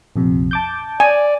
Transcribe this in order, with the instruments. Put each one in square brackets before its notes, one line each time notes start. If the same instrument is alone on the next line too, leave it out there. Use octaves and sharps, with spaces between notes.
[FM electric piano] A#1 F2 C3
A5 D6 G6
[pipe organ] D5 [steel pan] G#5